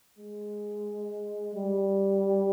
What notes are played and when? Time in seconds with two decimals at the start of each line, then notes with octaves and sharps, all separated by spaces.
0.18 G#3
1.55 G3